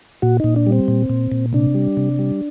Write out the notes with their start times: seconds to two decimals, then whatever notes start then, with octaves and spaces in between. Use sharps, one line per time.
0.22 A#2 F#4
0.40 A#2 D#4
0.56 D4
0.67 G3
0.72 C4
0.88 A#2
1.10 A#2
1.32 A#2
1.53 C3 D4
1.75 G3
1.97 C3
2.19 G3